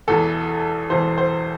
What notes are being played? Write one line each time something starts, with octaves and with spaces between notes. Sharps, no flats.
E1 E2 E3 A4
E1 E2 E3 C5
C5